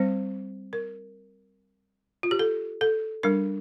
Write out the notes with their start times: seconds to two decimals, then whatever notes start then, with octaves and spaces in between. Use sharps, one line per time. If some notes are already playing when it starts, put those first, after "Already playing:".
Already playing: G3 C4 C5
0.73 A#4
2.23 F4
2.31 G4
2.39 A4
2.81 A4
3.23 G3 D4 A#4